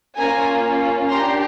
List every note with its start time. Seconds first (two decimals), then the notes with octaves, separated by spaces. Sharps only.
0.17 A#3 C#4 F4 G#5 A#5
1.10 D4 G4 A#5 C6